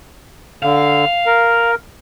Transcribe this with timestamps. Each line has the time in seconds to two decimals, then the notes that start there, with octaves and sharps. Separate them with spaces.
0.63 D3 F5
1.27 A#4